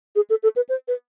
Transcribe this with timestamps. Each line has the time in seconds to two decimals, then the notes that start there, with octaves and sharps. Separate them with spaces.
0.16 G#4
0.30 A4
0.43 A4
0.56 B4
0.69 C5
0.88 B4